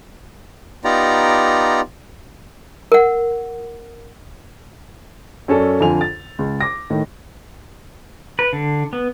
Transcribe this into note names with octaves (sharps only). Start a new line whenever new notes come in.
B3 D#4 F4 G4 D5 A#5
A#4 F#5
F#2 C#4 A4 D5
F2 D3 F4 G#5 F7
A6
C#2
D6 A#6
A2 D#3
B4
D3
B3